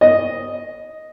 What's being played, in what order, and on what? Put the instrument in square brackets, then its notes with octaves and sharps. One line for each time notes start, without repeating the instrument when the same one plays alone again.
[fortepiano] D#5